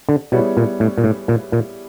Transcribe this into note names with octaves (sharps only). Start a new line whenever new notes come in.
D3
B2 G3 B3 E4 G#4 C#5
A#2
A2
A#2
A2
A#2
A#2